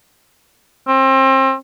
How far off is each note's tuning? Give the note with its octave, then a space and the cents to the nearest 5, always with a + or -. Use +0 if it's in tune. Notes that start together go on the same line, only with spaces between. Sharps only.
C4 +30